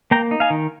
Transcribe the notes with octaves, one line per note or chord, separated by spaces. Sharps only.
A#3 G5 A#5
D#4
F5 G#5
D#3